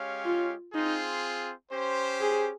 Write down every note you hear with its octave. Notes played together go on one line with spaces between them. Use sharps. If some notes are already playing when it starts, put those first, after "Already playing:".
Already playing: G#3 C#4 G4 C#5 F5
F4
C4 D#4 F4 G#4
C#4 G4 C5
G#4